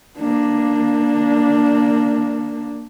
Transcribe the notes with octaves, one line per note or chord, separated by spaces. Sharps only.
A#3 D4